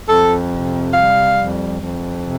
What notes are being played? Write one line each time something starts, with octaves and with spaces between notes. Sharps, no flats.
F2 A4
C3
G3 F5
F2
F2
C3